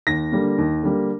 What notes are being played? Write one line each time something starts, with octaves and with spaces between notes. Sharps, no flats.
D#2 A#6
D3 G3 A#3
D#2
D3 G3 A#3